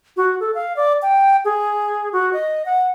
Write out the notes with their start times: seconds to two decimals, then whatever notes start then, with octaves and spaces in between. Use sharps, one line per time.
0.17 F#4
0.40 A4
0.55 F5
0.76 D5
1.02 G5
1.45 G#4
2.13 F#4
2.33 D#5
2.66 F#5